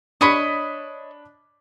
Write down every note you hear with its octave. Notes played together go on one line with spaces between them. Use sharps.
D4 C#5 D#5 B5 D#6 B6